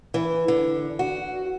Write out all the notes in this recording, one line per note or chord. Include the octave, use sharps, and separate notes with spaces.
E3
D3
F#4